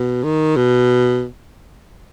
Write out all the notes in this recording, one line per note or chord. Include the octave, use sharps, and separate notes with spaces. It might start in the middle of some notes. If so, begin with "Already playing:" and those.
Already playing: B2
D#3
B2